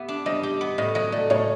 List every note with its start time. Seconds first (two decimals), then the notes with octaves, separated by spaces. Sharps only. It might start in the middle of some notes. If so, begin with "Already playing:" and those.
Already playing: B3 G4 E5
0.08 D4
0.26 G3 D#5
0.43 G4
0.61 B3
0.78 A2 D#5
0.95 F#3 D#5
1.12 A3 D5
1.30 A2 C#5